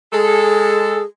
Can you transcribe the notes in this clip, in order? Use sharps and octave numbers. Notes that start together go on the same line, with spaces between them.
G#3 G#4 A4